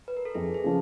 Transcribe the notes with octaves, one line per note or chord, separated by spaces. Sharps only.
B4
A#4
A4
F2 G#4
G#4
C#3 F3